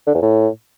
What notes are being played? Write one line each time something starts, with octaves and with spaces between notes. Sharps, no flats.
D3
E2
A2